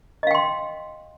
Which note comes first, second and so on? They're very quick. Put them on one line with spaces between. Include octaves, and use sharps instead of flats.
D#5 F5 G5 C6